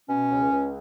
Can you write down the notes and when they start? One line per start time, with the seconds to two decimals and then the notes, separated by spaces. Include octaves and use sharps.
0.09 B2 C#4
0.30 C#2
0.52 C#2